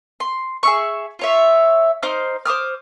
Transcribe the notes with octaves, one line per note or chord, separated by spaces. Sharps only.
C6
G#4 E5 C#6
F4 C#5 E5
D#4 C5 D6 F6
C5 D6 D#6 F6